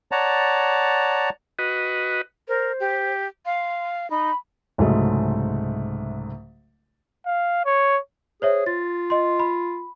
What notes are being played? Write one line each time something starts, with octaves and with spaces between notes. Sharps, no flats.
C#5 D5 F#5 A5 A#5
F#4 B4 D#5
A#4 C5
G4
F5 C6
D#4 B5
C2 G#2 C#3 F#3 G#3 A3
F5
C#5
G#4 C5 C#5 E5
F4 A6
D#5 C6
B5